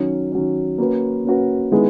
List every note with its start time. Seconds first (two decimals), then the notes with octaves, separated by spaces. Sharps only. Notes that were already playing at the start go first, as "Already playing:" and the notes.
Already playing: D#3 F#3 C#4
0.32 D#3 F#3 C#4
0.78 A#3 C#4 F#4 B4
1.25 A#3 C#4 F#4 B4
1.72 D#3 G#3 B3 E4 G#4